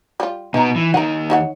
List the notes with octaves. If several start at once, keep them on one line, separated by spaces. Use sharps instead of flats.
G3 F4
B2 B3 D#4 A#5
E3
D#2 D#3 F#5 A#5
D#4 C#5 F#5